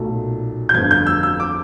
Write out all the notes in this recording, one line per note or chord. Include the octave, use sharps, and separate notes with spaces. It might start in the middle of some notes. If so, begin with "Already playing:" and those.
Already playing: B1 A#2 F#3 A3
G6
G1 F2 D3 G#6
G6
E6
E6
D6